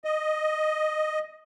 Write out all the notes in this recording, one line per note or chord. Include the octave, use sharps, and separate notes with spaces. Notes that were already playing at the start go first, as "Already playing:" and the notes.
D#5